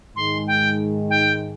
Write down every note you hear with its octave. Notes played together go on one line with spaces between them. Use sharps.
G#2 D#3 G#3 C6
G5
G5